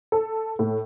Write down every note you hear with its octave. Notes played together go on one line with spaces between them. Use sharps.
A4
A2